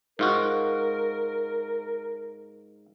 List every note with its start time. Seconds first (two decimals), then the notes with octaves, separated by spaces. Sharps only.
0.19 G#2 F4 F#4 A#4